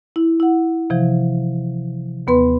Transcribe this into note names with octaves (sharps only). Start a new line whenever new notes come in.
E4
E4 F#5
C3 E3 F3
D#2 B3 B4 C6